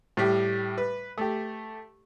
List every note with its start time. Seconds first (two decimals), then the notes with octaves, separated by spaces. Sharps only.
0.17 A2 G3
0.78 B4
1.18 A3 G4